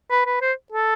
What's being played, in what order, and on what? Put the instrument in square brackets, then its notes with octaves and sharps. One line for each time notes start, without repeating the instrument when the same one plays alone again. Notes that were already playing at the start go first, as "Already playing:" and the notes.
[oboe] B4
B4
C5
A4